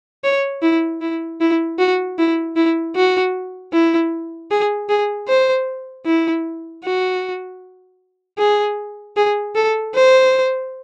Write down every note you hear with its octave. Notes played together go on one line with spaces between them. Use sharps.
C#5
E4
E4
E4
F#4
E4
E4
F#4
E4
G#4
G#4
C5
E4
F#4
G#4
G#4
A4
C5